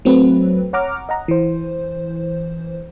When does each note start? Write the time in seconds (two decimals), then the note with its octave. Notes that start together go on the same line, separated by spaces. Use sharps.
0.05 F#3 A3 C4 B4
0.73 C#5 F#5 A#5 D6 F6
1.09 D#5 F#5 A#5
1.28 E3 C5